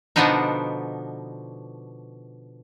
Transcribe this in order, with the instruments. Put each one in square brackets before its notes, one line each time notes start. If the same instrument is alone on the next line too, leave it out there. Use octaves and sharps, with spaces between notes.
[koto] B2 D3 F3 B3 D4 D#4